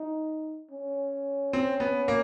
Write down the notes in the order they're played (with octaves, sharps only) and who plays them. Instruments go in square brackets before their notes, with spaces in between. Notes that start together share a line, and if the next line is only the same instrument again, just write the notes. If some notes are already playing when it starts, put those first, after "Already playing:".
Already playing: [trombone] D#4
C#4
[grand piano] C4
B3
A#3